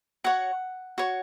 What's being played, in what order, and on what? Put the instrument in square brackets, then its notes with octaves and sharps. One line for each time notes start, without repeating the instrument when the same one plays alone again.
[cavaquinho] F#4 C#5 F#5
F#4 C#5